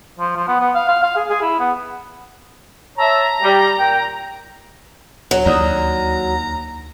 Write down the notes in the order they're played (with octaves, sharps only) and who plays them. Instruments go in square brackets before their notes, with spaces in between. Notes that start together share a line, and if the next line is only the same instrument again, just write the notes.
[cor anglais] F3
F3
B3
B3
F5
F5
F5
G#4
G#4
E4
B3
[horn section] C#5 E5 A5 [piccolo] A#5
[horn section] G3
A#2 G5
[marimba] D2 [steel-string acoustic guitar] F#3
[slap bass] D#2 [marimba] D5 D#6 [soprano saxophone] A#5